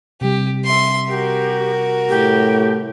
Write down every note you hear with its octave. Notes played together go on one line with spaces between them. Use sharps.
C3 G3 G4
E5 C6
F#4 G4 A#4
A2 G4